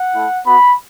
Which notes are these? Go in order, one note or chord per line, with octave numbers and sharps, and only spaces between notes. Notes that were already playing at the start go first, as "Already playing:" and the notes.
Already playing: F#5
A3 E4
B3 F#4 B5